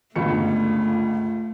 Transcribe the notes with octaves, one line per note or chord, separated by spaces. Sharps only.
G1 C#2 A3 C#7